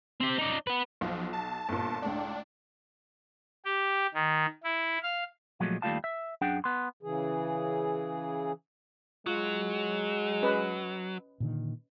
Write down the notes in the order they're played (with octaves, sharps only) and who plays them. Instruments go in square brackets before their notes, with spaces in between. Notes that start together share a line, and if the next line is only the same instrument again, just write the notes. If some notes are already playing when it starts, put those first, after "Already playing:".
[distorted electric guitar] C4 G4
D#4 D5
B3 B4
[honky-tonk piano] B1 [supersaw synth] F3
[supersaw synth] A5
[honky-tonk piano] G1 A#2
[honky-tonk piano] C#2 A2 [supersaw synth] D4
[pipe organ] G4
D#3
E4
F5
[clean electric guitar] A#2 F3 F#3 G#3 A3
D#2 G3 A3 F4 F5 A5
E5
F#2 D4 G#4 F#5 G5
B3 C6
[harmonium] C#3 E3 G#4
[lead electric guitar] F#3 [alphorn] G#3 [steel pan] F4
[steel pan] C#4 B4 D#5
[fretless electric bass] A#2 D3 D#3